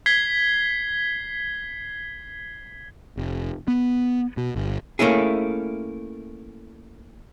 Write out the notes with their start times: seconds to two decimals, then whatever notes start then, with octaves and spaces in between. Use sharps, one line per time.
0.06 G#6 B6 C7 G7
3.17 F1
3.68 B3
4.37 B2
4.56 G1
4.99 A3 A#3 C#4 E4 G#4